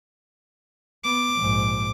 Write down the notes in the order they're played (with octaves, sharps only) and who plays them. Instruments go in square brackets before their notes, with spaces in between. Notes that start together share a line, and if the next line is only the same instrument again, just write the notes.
[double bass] B3 [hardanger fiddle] D6
[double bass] A#1 G#2